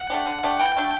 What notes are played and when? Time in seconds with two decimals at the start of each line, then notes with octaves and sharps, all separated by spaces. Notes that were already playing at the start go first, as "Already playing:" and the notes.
Already playing: F#5
0.10 A3 D4 G4
0.27 D3
0.43 A3 D4 G4
0.60 E3 G5
0.77 A3 D4 F#4